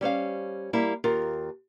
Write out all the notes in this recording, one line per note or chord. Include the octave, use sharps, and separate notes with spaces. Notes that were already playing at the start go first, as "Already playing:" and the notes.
G3 C#4 C5 F5
G3 A#3 E4
D#2 F4 A#4